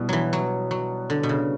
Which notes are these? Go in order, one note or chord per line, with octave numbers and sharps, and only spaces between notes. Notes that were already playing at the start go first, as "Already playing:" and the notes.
Already playing: B2 G3 B3 E4
E3 F#3
F#3
F#3
D3
B2
C#3